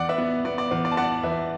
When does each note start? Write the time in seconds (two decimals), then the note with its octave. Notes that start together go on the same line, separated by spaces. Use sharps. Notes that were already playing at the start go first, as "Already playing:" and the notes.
Already playing: E2 D5 F#5
0.09 B4 E5
0.18 B3
0.45 B3 D5
0.58 D5
0.71 E2 B4
0.85 D5
0.92 A5
0.97 B3 D5 F#5
1.23 E2 B4 E5